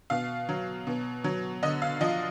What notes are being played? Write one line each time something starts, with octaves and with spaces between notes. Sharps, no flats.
B2 F5
F#3
B2
F#3
D3 D#5
F5
F3 D#5